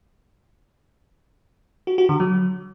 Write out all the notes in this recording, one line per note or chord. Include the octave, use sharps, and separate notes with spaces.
F#4
F#4
D3
F#3